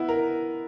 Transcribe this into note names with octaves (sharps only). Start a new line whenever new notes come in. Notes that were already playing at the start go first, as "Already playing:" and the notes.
Already playing: B3 E4
A#4